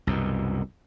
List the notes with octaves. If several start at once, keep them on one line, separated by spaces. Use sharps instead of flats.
C2 F#2 B2